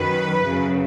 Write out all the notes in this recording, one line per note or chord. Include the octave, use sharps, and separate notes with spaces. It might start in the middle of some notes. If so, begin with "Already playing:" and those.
Already playing: F#2 D#3 F#3 B4
F#2 C#3 F#3